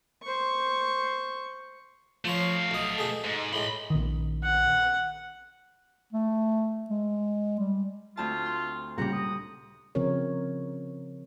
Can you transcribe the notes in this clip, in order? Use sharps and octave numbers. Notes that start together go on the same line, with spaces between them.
C5 C#6
F3 A3 C5 C#5 F5
B1 D#5
B2 G#4 A4
G#2
A2 G#3 B5 C6
A#1 D#3
F#5
A3
G#3
G3
D2 C4 F4 A5
C6
A#2 C#3 G3 G4 F#5 A#5
D#6
C#3 F3 C4 A#4 C#5